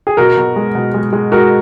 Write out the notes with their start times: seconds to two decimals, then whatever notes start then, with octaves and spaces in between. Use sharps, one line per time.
0.07 G#4
0.17 B2 F#4 A#4
0.37 B2
0.56 G#3
0.75 B2
0.94 G#3
1.13 G#3
1.32 G#3 F#4 A#4